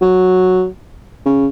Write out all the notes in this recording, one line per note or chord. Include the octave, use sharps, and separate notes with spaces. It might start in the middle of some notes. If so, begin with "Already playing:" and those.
F#3
C#3